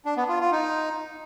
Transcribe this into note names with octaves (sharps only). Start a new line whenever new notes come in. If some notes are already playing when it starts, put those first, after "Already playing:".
D4
B3
F4
F4
D#4